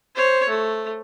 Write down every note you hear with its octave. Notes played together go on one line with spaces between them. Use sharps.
C5 C#5
A3